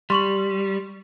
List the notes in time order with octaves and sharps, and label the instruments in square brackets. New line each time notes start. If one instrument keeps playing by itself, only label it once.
[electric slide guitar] G3 [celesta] C6 C#6 F#7